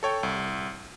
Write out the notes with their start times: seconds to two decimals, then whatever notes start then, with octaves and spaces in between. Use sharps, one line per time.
0.03 A4 C#5 G5
0.23 C2